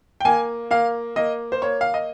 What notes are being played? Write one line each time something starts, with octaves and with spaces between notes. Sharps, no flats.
G5
A#3 G#5
A#3 F5
A#3 D#5
C5
A#3 C#5
F5
D#5